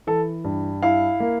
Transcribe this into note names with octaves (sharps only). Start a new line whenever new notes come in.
E3 A4
G2
E4 F5
A#3